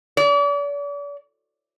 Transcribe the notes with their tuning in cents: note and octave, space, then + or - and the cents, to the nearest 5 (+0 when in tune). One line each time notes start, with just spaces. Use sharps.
D5 -40